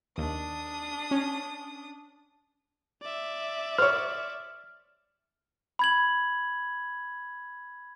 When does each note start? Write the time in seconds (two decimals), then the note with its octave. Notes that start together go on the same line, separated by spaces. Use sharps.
0.18 D#2 D4 D#6
1.11 C#4
3.02 D5 E5
3.78 C5 C#5 F6
5.79 B5 G#6 F#7